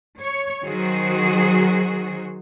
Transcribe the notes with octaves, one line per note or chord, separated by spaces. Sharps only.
C#5
D#3 F#3 F#4 G#4 C5